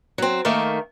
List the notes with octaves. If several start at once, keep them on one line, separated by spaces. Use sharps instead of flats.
F#3 C4
D#3 A3 A#3